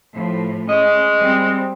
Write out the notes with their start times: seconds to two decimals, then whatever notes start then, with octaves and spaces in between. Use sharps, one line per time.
0.14 A2 F3
0.69 G#3 C#4 D#5
1.19 G3 C4